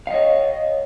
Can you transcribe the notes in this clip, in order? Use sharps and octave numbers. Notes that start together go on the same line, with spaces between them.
C#5 D#5 F5